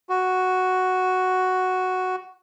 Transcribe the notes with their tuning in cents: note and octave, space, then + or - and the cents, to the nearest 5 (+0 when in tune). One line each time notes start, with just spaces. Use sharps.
F#4 +0